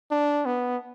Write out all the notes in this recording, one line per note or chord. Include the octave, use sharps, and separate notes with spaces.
D4
B3